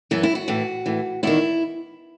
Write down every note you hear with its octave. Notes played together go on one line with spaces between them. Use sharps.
F#2 E3 B3
E4
F#4
A2 E3
A2 E3
E2 D#3 E4